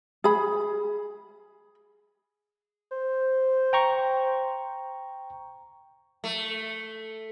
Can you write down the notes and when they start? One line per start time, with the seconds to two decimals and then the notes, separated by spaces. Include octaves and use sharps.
0.24 G#4 B5
2.92 C5
3.73 G5 A#5 C#6
6.24 A3